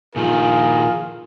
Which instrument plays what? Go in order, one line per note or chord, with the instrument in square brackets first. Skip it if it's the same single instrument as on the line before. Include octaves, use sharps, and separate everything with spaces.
[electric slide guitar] A#2 D#3 F3 [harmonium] F4 [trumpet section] G#4 A#4